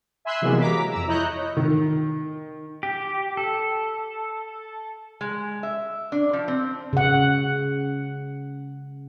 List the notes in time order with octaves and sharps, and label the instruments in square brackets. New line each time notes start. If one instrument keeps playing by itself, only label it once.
[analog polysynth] E5 G#5 B5 C6 E6 F#6
C3 E3 F#3 G#3 A#3 B3
A#5 D6 B6
F2 A#5 E6
E4 C#5 D#5 A#5 F#6 G6
[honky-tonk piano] D#3
[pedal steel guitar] G4
A4
[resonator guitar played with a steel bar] G#3
E5
D4
F3
C4
[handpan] C#3 F#5